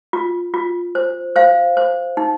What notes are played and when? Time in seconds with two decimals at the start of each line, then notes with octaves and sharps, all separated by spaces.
0.13 F4
0.54 F4
0.95 C5
1.36 C5 F5
1.77 C5
2.17 D#4